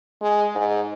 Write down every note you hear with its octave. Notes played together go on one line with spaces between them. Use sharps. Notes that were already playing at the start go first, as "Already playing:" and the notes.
G#3
G#2